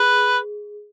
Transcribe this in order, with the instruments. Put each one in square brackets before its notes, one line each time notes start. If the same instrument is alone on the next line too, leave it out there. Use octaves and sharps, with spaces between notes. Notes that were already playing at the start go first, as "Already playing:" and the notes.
Already playing: [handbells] G#4 [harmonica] B4